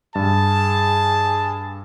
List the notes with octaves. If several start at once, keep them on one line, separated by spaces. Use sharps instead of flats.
G2 G#4 A5